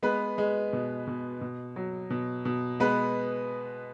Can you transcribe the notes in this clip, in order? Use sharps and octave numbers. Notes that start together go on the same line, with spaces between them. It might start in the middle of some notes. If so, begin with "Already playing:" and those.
G#3 B3 B4
G#3
B2
B2
B2
F#3
B2
B2
G#3 B3 B4